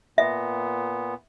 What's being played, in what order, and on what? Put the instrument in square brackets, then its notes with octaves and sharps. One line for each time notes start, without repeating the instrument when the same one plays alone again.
[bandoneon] A#2 B3 [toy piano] E5